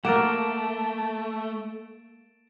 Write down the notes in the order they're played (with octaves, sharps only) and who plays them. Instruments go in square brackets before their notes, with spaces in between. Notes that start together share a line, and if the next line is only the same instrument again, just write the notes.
[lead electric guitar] A3 [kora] A#3 [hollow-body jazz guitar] A#4 F#5 [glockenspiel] A6 D7 E7